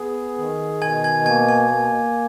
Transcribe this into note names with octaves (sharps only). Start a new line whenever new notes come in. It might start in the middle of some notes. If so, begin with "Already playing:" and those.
Already playing: B3 G#4
D#3
B2 G#5 G#6
G#5 G#6
A#3 G#5 G#6
G#5 G#6
A#3